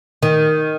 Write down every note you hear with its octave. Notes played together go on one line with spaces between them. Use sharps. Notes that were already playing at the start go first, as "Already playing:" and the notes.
D#3